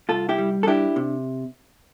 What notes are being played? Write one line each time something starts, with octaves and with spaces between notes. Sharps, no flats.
C2 F4 A4
E4 G4
G3
A4
D4 E4 G4
C3